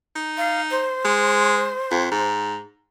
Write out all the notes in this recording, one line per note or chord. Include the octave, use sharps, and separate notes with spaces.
D#4
F5
C5
G#3
F2
G#2